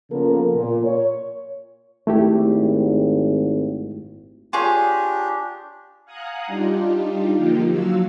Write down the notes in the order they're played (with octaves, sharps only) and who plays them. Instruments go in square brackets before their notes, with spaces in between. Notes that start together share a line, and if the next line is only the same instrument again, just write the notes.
[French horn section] C#3 F3 A#3 B3 A4 A#4
A#2
C#5
[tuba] G#1 [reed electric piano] A3 E4 G4
[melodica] D4 G4 [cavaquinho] F4 G#4 C#5
[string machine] F5 F#5 G#5 A#5 D#6 F#6
G3 D4 D#4 F4 G4
D3 F3 A#3 D#4 F4 G4
F3 F#3 F#4 F5 E6